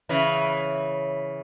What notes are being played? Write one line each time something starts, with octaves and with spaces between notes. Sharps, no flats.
C#3 E3